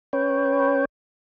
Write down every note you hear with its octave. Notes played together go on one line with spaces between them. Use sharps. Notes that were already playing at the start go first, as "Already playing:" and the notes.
C#4 B4 C#5 G5